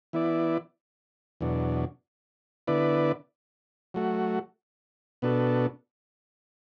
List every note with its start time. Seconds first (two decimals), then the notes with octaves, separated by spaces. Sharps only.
0.13 E3 B3 E4 D5
1.41 E2 B2 F#3 D4
2.67 D3 B3 E4 B4 D5
3.94 F#3 A3 F#4
5.22 B2 B3 D4 F#4 A4